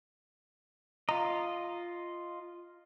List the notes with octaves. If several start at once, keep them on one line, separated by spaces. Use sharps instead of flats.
F4 D#5 A#5